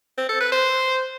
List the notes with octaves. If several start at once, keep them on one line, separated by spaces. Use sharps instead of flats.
C4
A4
B4
C5